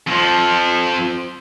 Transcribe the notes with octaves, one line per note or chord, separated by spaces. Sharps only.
F2 F3